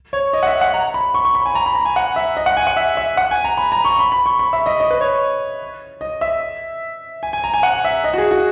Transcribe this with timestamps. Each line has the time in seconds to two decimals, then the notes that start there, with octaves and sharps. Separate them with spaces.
0.13 C#5
0.33 D#5
0.43 F#5
0.47 E5
0.61 F#5
0.74 A#5
0.94 B5
1.14 C#6
1.25 C#6
1.35 B5
1.46 G#5
1.55 A#5
1.66 B5
1.75 A#5
1.85 G#5
1.96 F#5
2.16 E5
2.37 D#5
2.46 F#5
2.57 G#5
2.67 F#5
2.77 E5
2.97 E5
3.17 F#5
3.31 G#5
3.45 A#5
3.58 B5
3.72 A#5
3.85 C#6
3.99 B5
4.12 B5
4.26 C#6
4.39 B5
4.53 E5
4.66 D#5
4.80 D#5
4.91 B4
5.01 C#5
6.01 D#5
6.21 E5
7.23 G#5
7.33 G#5
7.44 A#5
7.54 G#5
7.63 F#5
7.85 E5
8.04 D#5
8.14 F#4
8.18 G#4
8.31 F#4